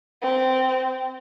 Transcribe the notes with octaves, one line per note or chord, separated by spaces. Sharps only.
C4